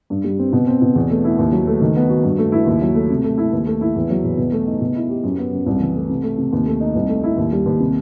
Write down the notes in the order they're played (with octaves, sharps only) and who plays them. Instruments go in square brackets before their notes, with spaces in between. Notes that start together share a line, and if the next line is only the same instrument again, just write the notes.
[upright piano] G2
G3
C4
B2
C4
B2
E2
A3
E4
D#2
F#3
A3
D#3
B3
F#4
G2
A3
E4
D#2
F#3
A3
C3
A3
E4
D#2
A3
E4
E2
F#3
E2
B2
A3
D#4
B2
E4
G4
F#2
B3
F#2
C2
E3
A3
C3
A3
C3
D#2
A3
D#4
C2
A3
E4
D#2
G3
D#2
C3